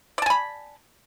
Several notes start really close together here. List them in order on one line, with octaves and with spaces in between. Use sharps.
D5 A5 G#5 B5